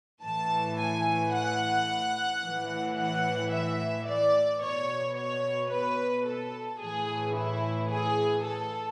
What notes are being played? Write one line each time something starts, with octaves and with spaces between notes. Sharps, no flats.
A2 E3 A5
G#5
F#5
A2 E3
F#5
E5
D5
B2 C#5
C#5
B4
A4
A2 E3 G#4
E4
G#4
A4